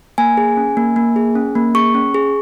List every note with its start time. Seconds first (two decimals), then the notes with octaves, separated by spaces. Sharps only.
0.18 A#3 G#5
0.37 G#4
0.57 C#4
0.77 A#3
0.96 A#3
1.16 G#4
1.35 C#4
1.55 A#3
1.75 G#4 C#6
1.94 C#4
2.14 G#4